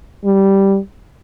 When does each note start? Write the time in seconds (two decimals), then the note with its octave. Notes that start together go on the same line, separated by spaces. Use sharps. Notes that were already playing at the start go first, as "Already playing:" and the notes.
0.25 G3